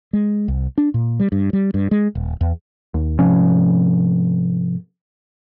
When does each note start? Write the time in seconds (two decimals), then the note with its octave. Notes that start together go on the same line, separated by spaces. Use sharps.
0.13 G#3
0.48 C2
0.78 D4
0.94 A#2
1.20 G3
1.32 G2
1.53 G3
1.74 G2
1.91 G#3
2.15 D#1
2.41 E2
2.94 D#2
3.19 G#2 C3 F3 C#4